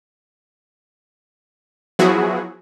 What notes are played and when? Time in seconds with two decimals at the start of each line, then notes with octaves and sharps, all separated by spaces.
1.99 F3 F#3 B3 E4 F#4 G#4